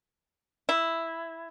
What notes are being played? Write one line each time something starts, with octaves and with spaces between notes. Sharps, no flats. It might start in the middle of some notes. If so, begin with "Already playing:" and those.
E4